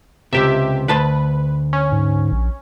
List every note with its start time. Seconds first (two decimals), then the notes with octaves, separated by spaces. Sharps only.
0.33 C#2 G#2 C3 G4 E5
0.88 D2 B4 A5 C6
1.73 C#4
1.92 G#2
2.32 A#1